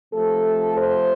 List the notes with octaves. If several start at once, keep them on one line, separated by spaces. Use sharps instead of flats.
C3 F3 A3 A4
C5